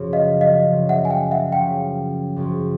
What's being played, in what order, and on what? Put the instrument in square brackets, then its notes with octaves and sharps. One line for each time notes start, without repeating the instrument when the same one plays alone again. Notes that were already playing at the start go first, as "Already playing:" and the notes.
Already playing: [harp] F#2 C#3 F3
[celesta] D#5 F5
D#5 F5
[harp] F#2 C#3 F3
[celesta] E5 F#5
G#5
F5 G5
E5 F#5
[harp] F#2 C#3 F3 [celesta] F5 G5
[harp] F#2 C#3 F3